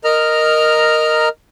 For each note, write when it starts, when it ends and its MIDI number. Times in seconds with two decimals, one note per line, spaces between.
0.04 1.29 70
0.04 1.29 75
0.04 1.29 82
0.04 1.29 89